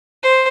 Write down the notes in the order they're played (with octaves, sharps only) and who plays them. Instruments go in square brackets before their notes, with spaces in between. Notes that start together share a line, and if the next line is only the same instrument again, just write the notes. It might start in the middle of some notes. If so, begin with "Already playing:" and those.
[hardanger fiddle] C5